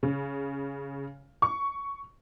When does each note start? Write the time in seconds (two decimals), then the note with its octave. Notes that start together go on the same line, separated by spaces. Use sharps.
0.03 C#3
1.42 C#6